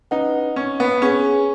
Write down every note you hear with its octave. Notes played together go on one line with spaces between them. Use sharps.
C#4 D#4 B4 F#5
C#4
B3
C#4 G#4 B4 G#5